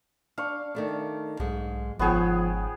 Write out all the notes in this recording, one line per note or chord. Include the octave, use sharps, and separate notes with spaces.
D4 F5 C#6
D#3 A3 D4
B1 G#2 G#3
G1 G#2 F3 B3 G#4 C#5 G5